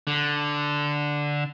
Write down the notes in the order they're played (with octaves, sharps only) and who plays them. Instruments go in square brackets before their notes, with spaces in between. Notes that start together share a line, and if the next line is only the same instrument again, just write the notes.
[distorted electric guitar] D3